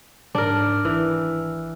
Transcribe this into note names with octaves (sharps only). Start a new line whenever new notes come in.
G#2 D4 A#4
G#1 E3